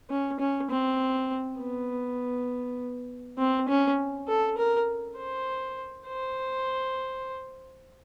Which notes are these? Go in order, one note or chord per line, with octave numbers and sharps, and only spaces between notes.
C#4
C#4
C4
B3
C4
C#4
A4
A#4
C5
C5